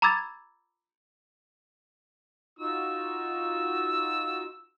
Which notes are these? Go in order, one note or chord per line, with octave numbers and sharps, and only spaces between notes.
A#5 B5 D6 E6 G#6 A6
D#4 F4 F#4 E6